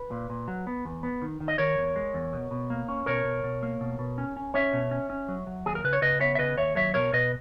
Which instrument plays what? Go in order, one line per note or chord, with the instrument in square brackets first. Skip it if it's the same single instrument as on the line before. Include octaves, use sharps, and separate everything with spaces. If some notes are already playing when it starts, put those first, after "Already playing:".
Already playing: [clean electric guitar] B4
A#2
A#2
F#3
B3
E2
B3
D#3
D#3
D#5
D#3 A#4 C#5
E2
G#3
E2
B2
B2
A#3
C#4
B2 A#4 C#5
B2
B2
A#3
B2
B2
C#4
C#4
C#4 C#5 E5
B2
C#4
C#4
F#3
F#3
D#2 G#4
A#4
C#3 B4
C#5
C#3 B4 D#5
B3 C#5 E5
E5
C#3 B4 D#5
D#2 C#5 E5
F#3 C#5 E5
B2 A#4 C#5
B2 B4 D#5